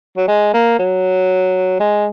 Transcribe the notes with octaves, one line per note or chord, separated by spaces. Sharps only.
F#3
G#3
A#3
F#3
G#3